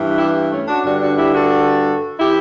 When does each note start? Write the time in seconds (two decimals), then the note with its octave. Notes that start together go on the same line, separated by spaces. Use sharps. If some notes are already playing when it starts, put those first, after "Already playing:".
Already playing: G2 E3
0.18 E4 G4
0.51 A3 C#4
0.68 D4 F#4
0.85 G2 D3 D4 F#4
1.01 D4 F#4
1.18 E4 G4
1.35 F#4 A4
2.19 E3 E4 G4